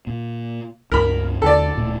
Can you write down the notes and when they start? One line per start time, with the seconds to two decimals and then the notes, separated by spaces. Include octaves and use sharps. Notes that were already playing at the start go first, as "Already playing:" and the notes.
0.07 A#2
0.92 C#2 G2 A#4 B5
1.42 D#2 D3 A4 D5
1.75 D1 A#2 A3